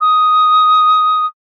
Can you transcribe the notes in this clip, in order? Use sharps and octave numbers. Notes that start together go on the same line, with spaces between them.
D#6